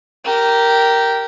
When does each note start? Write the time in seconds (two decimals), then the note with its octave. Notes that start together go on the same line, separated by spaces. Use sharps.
0.25 G4 A#4